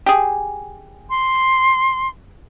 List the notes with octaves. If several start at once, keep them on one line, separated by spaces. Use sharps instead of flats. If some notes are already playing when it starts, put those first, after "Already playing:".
G4 G#4
C6